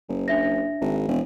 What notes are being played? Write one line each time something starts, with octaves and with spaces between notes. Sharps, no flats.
F#1
D4 E5 A#6
G#1
E1